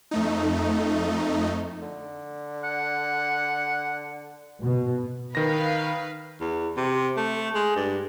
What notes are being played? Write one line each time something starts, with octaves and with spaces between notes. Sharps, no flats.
F2 A3 D#4
D3
F#5
B2
D#3 B4 F5 A#6
E2
C3
A3
G#3
G2